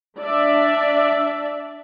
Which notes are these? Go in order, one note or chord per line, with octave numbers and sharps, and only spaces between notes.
D4 D5 E5